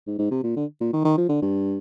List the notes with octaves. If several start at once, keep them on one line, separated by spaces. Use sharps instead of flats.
G#2
G#2
C3
A#2
D3
A#2
D#3
D#3
F3
D3
G2